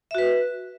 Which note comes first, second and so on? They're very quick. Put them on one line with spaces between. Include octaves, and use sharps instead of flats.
E5 F#4 B4